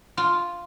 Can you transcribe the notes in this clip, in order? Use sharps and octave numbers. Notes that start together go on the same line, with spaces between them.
F4